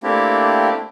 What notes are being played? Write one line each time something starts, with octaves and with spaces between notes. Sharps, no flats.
A3 A#3 C4 D4 E4 G4